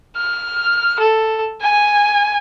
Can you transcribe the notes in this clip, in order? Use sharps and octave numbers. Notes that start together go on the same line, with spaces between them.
F6
A4
G#5